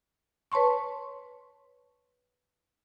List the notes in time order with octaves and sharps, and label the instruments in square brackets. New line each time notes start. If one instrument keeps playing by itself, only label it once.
[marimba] B4 C#5 A5 C6 C#6